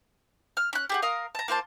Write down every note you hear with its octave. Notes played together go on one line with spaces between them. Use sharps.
F6
C#4 F#6
G4 G#4 F#5
A#4 F5 D#6
A5 A#5
A#3 F4 C5 A5